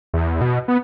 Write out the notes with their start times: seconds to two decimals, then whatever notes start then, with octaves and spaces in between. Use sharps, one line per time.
0.14 E2
0.41 B2
0.68 B3